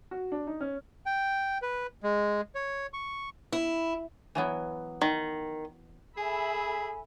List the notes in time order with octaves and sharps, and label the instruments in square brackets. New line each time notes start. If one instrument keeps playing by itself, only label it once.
[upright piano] F#4
D4
D#4
C#4
[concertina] G5
B4
G#3
C#5
C#6
[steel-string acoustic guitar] E4
[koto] E3 F#3 B3
[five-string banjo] D#3
[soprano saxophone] G#4 [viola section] A4 E5 B5 [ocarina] G#5